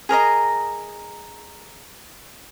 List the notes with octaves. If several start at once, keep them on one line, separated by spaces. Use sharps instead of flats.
G#4 A#4 D#5 A#5